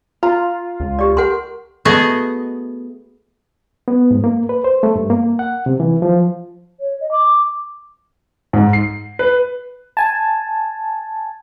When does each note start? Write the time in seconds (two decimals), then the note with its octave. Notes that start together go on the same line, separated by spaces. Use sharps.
0.23 F4 A#5
0.80 C#2
0.99 G4 D5
1.17 G4 A#4 F#5 C6
1.85 A3 B3 F#4 G#4 D#5
3.88 B3
4.11 G#2
4.24 A#3
4.49 B4
4.64 C5
4.83 A3
4.96 G2
5.10 A#3
5.39 F#5
5.66 C3
5.80 E3
6.02 F3
6.80 C#5
7.00 D#5
7.12 D6
8.53 G#2
8.73 C7
9.19 B4
9.97 G#5 A5